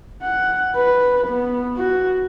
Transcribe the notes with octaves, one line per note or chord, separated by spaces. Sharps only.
F#5
B4
B3
F#4